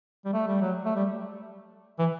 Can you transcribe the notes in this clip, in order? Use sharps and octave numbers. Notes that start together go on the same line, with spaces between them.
G3
A3
G3
F#3
A3
G3
E3